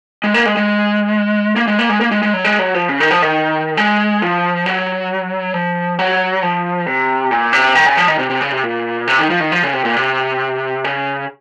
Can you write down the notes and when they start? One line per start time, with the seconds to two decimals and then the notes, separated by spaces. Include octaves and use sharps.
0.24 G#3
0.34 A#3
0.46 G#3
0.57 G#3
1.56 A#3
1.67 G#3
1.79 A#3
1.89 G#3
2.01 A#3
2.11 G#3
2.23 G#3
2.34 F#3
2.45 G#3
2.59 F#3
2.74 F3
2.89 C#3
3.00 D#3
3.11 F3
3.22 D#3
3.77 G#3
4.22 F3
4.66 F#3
5.54 F3
5.99 F#3
6.43 F3
6.86 C3
7.31 A#2
7.53 C3
7.75 D#3
7.86 C#3
7.97 F3
8.08 D#3
8.19 C3
8.30 C3
8.41 C#3
8.52 C3
8.64 A#2
9.07 C3
9.19 D#3
9.30 F3
9.40 D#3
9.52 F3
9.63 C#3
9.73 C3
9.85 A#2
9.96 C3
10.84 C#3